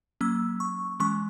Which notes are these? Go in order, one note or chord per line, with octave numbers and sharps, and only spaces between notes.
F#3 A#3 C#4 E6
C#6
E3 G#3 C#4 C#6